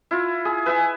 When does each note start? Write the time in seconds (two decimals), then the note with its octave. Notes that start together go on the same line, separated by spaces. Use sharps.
0.11 E4 F4
0.45 G#4
0.66 B4 E5 G#5